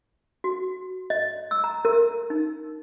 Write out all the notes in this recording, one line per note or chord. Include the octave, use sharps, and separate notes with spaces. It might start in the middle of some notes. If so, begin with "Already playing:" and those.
F#4
D#5
E6
A#5
A#4
D#4